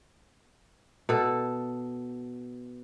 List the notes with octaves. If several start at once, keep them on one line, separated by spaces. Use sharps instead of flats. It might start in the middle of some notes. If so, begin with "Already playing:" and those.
B2 A4